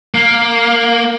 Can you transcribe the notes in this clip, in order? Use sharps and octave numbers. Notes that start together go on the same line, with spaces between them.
A#3